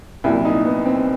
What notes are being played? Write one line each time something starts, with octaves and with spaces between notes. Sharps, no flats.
C2 A#2 F#3 E4
D#4
B3
C4